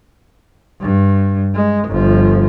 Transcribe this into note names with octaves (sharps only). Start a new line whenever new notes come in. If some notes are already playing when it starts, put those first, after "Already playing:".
G2
G#3
G1 F3